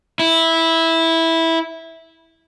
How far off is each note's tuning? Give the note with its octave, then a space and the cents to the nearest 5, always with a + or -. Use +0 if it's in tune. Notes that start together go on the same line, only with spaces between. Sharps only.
E4 -10